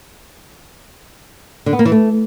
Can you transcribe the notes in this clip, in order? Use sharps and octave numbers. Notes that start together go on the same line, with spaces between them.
D3
B3
A#3
E3
A3